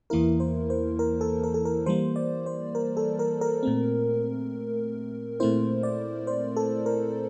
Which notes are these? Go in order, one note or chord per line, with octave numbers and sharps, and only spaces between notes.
E2 E3 A#3 E4 A#4
C5
C5
A#4
A4
A#4
A4
A#4
E3 G3 A#3 C5
D5
C5
A#4
A4
A#4
A#4
A#2 A3 C4
A#2 A3 C4 E4 C5
D5
C5
A4
A#4